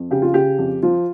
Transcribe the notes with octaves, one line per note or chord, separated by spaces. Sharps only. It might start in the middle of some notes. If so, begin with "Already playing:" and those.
Already playing: F2
C#3 G4
F4
C#3 G4
F2
F3 F4